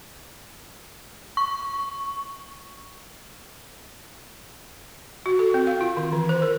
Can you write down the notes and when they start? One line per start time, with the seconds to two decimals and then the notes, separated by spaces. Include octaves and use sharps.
1.37 C#6
5.26 F#4
5.39 A4
5.54 C4
5.67 F5
5.81 F4
5.97 D#3
6.13 E3
6.29 C5
6.42 A#4